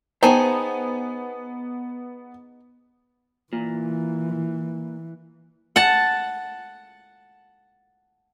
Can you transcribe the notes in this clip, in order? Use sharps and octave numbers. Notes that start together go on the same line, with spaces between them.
B3 D#4 G#4 C5 C#5 G5 A5
A#2 E3
F#5 A5